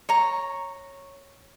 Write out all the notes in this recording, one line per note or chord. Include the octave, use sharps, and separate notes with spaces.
C#5 A#5